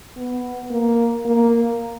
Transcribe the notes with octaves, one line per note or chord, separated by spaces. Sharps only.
B3
A#3
A#3